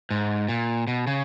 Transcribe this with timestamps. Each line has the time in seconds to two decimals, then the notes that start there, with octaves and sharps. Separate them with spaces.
0.11 G#2
0.49 A#2
0.87 B2
1.07 C#3